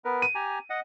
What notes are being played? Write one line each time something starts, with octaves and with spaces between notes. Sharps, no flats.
B3 A#4 B4
D#7
G4 G#5 A#5
D#5 F#5